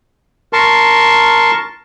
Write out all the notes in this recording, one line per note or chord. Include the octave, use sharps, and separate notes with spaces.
A#4 A5 C6 C#6